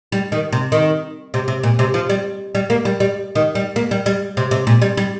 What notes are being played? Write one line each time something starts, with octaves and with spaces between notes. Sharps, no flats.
G3
D#3
C3
D#3
C3
C3
A#2
C3
F3
G3
G3
A#3
G3
G3
D#3
G3
A#3
G3
G3
C3
C3
A#2
G3
G3